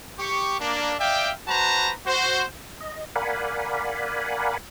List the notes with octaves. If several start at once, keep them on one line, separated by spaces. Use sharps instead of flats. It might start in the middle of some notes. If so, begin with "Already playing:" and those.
G4 C#6
A#3 D4
D5 E5 F5 G5
F#4 B4 C5 A5 A#5
F#4 C5
D#5
A#4 D5 F5 F#5 G#5 B5